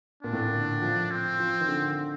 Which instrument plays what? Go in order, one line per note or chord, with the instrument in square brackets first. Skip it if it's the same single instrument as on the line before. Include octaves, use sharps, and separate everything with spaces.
[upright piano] A#2 [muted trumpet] D4
[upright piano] A2
A#2
D3
F3
[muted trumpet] C4
[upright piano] F3
D#3
D3